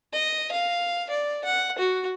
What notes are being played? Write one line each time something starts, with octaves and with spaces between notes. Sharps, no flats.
D#5
F5
D5
F#5
F#4